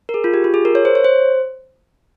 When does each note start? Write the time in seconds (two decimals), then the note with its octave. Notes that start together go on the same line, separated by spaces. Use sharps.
0.09 A#4
0.14 G#4
0.24 F4
0.34 G4
0.44 F4
0.54 G#4
0.65 A#4
0.75 C#5
0.85 C5
0.95 C#5
1.05 C5